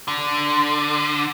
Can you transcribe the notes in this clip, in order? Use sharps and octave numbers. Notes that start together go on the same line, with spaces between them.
D3